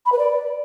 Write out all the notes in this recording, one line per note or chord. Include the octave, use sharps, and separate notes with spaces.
B5
B4
D5